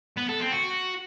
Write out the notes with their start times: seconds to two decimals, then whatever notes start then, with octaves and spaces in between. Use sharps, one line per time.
0.17 B3
0.29 A4
0.41 C4
0.52 F#4